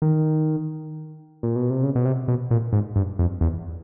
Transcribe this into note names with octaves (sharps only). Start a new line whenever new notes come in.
D#3
A#2
B2
C3
C#3
B2
C3
B2
A#2
G#2
G2
F2
E2